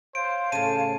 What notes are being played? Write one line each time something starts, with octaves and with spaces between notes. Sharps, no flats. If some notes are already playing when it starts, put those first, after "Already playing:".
C5 C#5 F5 G5 D7
A2 C#3 A5 D#7